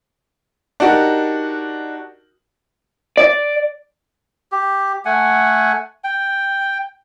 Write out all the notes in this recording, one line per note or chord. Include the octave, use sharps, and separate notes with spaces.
D4 D#4 F#4 G4 A#4
D5
G4
A3 F#5 G#5
G5